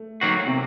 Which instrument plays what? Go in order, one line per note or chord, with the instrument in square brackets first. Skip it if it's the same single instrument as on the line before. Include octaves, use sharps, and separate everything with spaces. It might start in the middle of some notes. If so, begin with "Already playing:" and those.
Already playing: [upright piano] A3
[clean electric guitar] D#3 F#3 A#3 F#4
[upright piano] C3